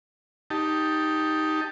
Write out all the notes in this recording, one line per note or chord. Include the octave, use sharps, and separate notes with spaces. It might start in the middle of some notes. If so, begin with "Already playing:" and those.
D#4 G4 A5